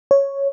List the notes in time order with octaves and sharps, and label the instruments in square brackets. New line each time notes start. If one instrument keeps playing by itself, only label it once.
[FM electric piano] C#5